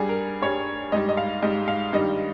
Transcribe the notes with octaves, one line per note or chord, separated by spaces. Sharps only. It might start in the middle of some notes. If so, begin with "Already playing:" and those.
Already playing: G2 G3 G#4
A#4
G2 G3 C#5
G#2 G3 D#5
D#5
F5
G#2 G3 D#5
F5
G2 D#3 G3 D#5